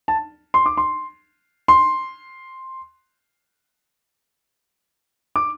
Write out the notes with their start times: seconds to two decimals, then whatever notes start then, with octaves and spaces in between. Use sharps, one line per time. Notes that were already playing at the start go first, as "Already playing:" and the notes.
0.08 A5
0.54 C6
0.66 D6
0.77 C6
1.68 C6
5.36 D6